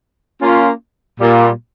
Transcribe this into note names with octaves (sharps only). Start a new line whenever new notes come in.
A#3 C#4 F4
A#2 G3 A#3